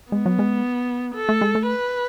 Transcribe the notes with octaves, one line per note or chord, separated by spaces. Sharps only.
G#3 B3
F#3
G#3
A4
A3
G#3
A3
B4